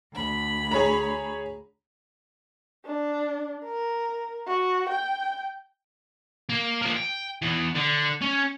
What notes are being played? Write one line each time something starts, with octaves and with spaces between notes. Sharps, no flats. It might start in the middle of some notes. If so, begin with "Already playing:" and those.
D2 B5
G#4 C#5 A#5
D4
A#4
F#4
G5
A#3
F3 A#3
G5
E3 B3
D3
C#4